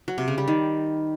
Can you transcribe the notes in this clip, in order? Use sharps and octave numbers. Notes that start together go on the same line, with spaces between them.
F#3
C3
C#3
G3
D#3